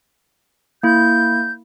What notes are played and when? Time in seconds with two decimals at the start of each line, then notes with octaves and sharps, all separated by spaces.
0.83 A#3 E4 G6